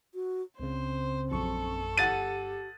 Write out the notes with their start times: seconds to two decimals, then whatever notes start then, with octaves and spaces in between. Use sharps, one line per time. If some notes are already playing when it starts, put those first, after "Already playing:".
0.14 F#4
0.59 C#2 C#3 C4 C5
1.31 A#1 F#2 A4 C#6
1.98 G1 G4 F#5 A6 D#7